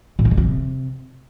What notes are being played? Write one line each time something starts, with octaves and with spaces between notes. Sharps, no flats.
A2
D#3
F2
C3